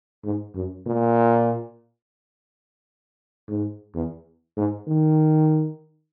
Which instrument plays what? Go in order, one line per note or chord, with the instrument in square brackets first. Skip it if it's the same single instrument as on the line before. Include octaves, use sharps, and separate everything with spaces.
[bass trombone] G#2
F#2
A#2
G#2
E2
G#2
D#3